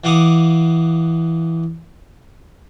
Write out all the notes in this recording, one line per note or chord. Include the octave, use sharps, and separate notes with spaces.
E3 F5 F#5 D6 D#6